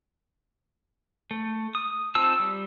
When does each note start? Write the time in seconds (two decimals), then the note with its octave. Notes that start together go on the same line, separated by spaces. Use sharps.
1.31 A3
1.75 D#6
2.15 C4 D#4 F4 A5 E6
2.39 G3